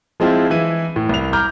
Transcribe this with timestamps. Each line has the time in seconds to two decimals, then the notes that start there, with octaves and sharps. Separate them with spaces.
0.20 F3 G#3 C4 E4 F4
0.50 E3 E4 D#7
0.96 A2
1.09 C2 F7
1.33 A#5 D6 F6 G6